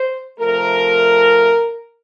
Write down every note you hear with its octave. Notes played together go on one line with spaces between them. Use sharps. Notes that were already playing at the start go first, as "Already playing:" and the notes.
Already playing: C5
C3 F3 A3 A#4